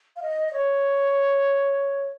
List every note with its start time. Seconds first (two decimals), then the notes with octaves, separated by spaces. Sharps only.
0.16 F5
0.22 D#5
0.48 D#5
0.53 C#5